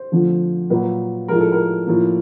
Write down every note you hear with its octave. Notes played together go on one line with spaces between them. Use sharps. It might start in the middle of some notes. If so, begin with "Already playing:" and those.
Already playing: C5
F2 D3 F3 A3
A#2 F#3 A#3 B4
A2 F3 G#3 A#4
A4
A#4
A2 F3 A#3